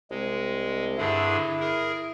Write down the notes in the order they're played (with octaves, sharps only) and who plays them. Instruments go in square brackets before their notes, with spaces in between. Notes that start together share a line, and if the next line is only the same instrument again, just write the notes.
[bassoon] C2 [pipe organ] G#3
[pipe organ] G2 D3 G#4 [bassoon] E4
[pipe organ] G#4 A#4